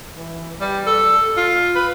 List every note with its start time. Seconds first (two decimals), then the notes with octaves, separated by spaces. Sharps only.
0.12 E3
0.61 G3
0.87 A4
1.37 F4
1.75 B4